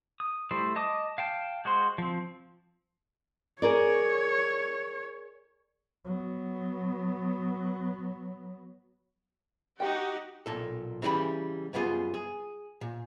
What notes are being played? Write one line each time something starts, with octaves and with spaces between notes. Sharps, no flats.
D#6
G3 A3 E4 C5
D#5 A5 D6 D#6
F5 G5 A5
G#3 F#4 C5 C6
F3 C4
G#4 A#4 C#5 D5
F#3 B3
D#4 F#4 G4 F#5 G5
B1 A#2 A4
C#3 E3 G3 A4 B5
F#2 G3 B3 F4 G#4
G#4
A#2